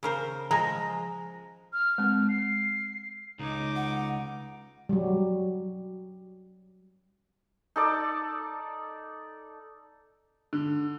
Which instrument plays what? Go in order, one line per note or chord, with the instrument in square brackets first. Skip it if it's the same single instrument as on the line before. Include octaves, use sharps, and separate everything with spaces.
[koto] C#3 A#4 C5
[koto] F3 G#3 [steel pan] A#5
[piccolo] F6
[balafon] G#3 C4
[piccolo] C7
[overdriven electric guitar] C#2 [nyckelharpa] D#4 D6
[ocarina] F#5
[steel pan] F#3 G3
[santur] D#4 A4 D5
[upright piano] D3